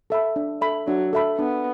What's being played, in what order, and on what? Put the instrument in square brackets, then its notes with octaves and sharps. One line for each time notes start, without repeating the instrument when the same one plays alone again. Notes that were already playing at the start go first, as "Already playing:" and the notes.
[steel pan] A4 E5 B5
D4
A4 E5 B5
[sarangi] F#3 [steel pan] D4
[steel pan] A4 E5 B5
[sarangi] B3 [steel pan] D4